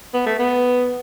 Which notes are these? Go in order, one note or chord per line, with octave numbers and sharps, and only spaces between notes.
B3
A3
B3